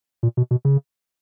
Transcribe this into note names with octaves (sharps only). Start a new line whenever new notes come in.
A#2
B2
B2
C#3